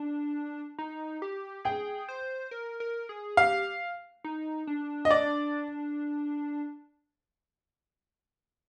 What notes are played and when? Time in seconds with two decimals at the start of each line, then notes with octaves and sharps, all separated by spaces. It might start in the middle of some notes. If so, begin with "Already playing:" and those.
Already playing: D4
0.79 D#4
1.22 G4
1.65 G#4 G5
2.09 C5
2.51 A#4
2.80 A#4
3.09 G#4
3.37 G4 F5
4.24 D#4
4.67 D4
5.05 D#5
5.11 D5